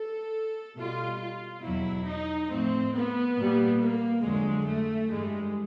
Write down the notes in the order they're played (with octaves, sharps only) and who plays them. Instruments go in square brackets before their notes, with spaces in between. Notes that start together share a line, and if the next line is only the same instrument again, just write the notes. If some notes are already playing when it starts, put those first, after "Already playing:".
Already playing: [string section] A4
B2 G3 F4
F4
E2 B2 F#3 E4
D#4
A2 F3 C4
B3
A#2 G3
A#3
F2 D3 F#3 G#3
A3
G2 E3 G3 G#3